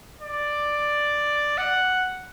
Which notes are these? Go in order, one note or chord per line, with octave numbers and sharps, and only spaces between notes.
D5
F#5